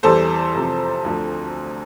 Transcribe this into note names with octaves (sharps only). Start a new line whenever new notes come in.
E2 E3 G3 A4 C5
F1 E2 C3 F3
D2 D3 F3